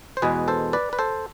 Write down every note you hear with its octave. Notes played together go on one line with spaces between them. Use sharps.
C5
E2 B2 G#3 G#4 B4
A4 C5
B4 D5
B4
A4 C5